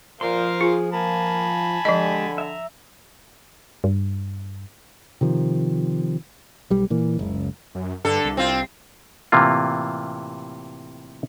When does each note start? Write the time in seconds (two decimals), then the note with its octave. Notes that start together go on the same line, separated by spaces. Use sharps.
0.21 A#2 F3 A#4 C5 F5 C6
0.61 F4 G#4
0.93 A#3 G#5 A5 B5
1.85 D3 F3 G#3 G4 D#5
2.38 E5 A#5
3.84 G2
5.21 C3 D#3 F3
6.70 B1 G3
6.90 A#2 E3 A#3
7.19 F#1 C#2
7.75 F#2
8.05 G2 D3 A4
8.25 C2
8.37 C4 F4
9.32 A2 C3 E3 A#3 F4